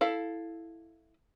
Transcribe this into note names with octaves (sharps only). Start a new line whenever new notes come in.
E4 A4 F5